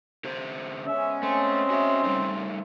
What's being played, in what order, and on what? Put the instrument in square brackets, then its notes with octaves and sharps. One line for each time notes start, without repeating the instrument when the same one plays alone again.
[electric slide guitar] D3 G4 C5
[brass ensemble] G#3 B3 C#4 [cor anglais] E5
[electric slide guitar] A3 [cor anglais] C4
[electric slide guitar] F#4 E5
G3 A3 D#4